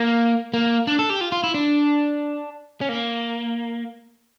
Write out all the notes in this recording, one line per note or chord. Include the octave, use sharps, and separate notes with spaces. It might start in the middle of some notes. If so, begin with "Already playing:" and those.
Already playing: A#3
A#3
D4
A4
G4
F4
F4
E4
D4
C#4
A#3